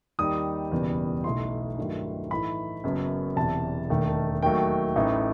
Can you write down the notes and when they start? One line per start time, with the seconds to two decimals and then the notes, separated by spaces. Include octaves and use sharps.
0.19 D#2 D#3 G3 D#4 D#6
0.72 F#1 E2 B2 G3 B3
1.24 B1 B2 A3 E4 C6
1.78 G2 D#3 F#3 A3 E4
2.30 A2 E3 A3 D#4 B5
2.84 F#1 F#2 F#3 B3
3.36 E1 E2 C3 A5
3.90 E1 D#2 D#3 A3 D#4
4.43 D#2 D#3 F#3 A3 G5
4.96 A1 A2 E3 A3 D#4